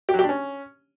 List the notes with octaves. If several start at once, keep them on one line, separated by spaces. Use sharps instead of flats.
G4
F#3
G4
D4
C#4